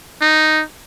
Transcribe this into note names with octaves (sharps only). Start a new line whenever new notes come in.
D#4